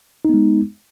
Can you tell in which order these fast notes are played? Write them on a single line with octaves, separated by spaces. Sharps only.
D#4 B3 G#3